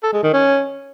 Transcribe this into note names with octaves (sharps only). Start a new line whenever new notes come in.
A4
G#3
D#3
C#4